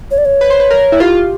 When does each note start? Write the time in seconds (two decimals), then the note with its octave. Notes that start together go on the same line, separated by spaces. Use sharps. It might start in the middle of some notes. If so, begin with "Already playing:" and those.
0.11 C#5
0.18 D5
0.25 C#5
0.41 B4
0.50 C5
0.60 B4
0.70 A#4
0.92 E4
1.00 F4 G4